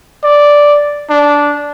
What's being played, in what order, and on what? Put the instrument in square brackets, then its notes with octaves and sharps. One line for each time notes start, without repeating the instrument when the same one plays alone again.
[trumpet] D5
D4